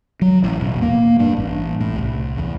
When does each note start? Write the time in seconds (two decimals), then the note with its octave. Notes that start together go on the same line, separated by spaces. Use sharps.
0.22 F#3
0.44 A1
0.57 E1
0.82 A#3
1.19 G2
1.37 A1
1.80 A2
1.96 C2
2.37 E2